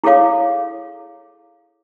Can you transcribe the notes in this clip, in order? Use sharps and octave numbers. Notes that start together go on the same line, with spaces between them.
E4 G#4 A4 C#5 F5 D6